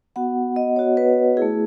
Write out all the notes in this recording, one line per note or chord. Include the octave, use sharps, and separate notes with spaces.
B3 F#4 F#5
D#5
B3 F#4 C#5
B4
A3 E4 G#4